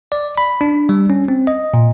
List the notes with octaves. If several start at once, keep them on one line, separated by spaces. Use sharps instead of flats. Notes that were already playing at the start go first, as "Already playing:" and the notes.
D5
B5
D4
G3
C#4
C4
D#5
A#2